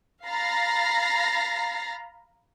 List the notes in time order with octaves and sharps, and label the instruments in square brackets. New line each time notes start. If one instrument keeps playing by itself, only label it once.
[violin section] F5 A#5 B5 A6 A#6 C7